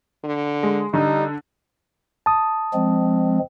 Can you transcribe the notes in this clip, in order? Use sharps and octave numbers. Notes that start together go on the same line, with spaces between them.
D3
G#3
D3 G3 D#4
A5 D#6
F3 G#3 C4